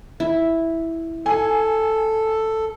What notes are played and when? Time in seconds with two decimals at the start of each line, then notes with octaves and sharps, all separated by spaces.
0.20 E4
1.26 A4 G#5